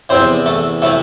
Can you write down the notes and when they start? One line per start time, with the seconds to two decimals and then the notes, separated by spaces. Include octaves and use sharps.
0.09 E2 C3 E3 C4 C5
0.46 A3 A4
0.82 C3 E3 A3 A4